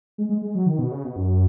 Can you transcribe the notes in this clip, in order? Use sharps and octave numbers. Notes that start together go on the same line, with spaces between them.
G#3
G#3
G#3
F#3
D#3
B2
C#3
B2
F#2